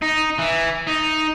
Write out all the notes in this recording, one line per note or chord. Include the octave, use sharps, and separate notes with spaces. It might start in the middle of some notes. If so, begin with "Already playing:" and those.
D#4
E3
D#4